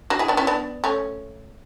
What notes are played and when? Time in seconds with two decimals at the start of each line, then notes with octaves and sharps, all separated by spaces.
0.10 D4 F#4
0.19 E4 G#4
0.28 B3 D4
0.37 C#4 E4
0.47 B3 D4
0.84 A3 C#4